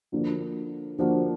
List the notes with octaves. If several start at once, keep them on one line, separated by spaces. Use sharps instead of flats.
D3 F3 A#3 D4 F#4
D3 F3 A#3 D4 F#4